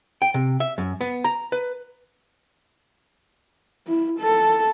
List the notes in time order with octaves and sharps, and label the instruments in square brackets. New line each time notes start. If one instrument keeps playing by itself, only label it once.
[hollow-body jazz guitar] G5
C3
E5
F#2
B3
A#5
B4
[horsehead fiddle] E4
A4